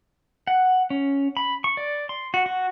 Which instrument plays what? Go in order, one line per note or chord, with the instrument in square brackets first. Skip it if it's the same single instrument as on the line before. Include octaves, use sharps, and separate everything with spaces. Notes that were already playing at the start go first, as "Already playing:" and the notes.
[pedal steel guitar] F#5
C#4
B5
C#6
D5
C6
F#4
F#4